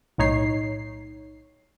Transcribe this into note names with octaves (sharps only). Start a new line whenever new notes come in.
B1 A2 D#4 C#5 C7